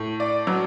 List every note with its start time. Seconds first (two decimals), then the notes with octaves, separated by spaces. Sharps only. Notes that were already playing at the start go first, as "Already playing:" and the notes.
Already playing: A2
0.20 D5
0.47 F#3